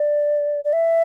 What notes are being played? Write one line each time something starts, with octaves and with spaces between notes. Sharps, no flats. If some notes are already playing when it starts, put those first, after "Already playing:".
Already playing: D5
D5
E5